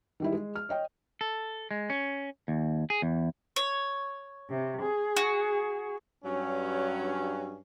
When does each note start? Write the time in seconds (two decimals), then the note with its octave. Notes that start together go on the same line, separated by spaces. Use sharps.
0.20 D#3 G3 E4
0.32 G#3 G#4
0.56 F6
0.69 C#5 D#5 G5
1.21 A4
1.71 G#3
1.90 C#4
2.48 D#2
2.90 G#4
3.02 E2
3.56 C#5
4.49 C3
4.82 G#4
5.16 F#4
6.24 G2 F#3 C#4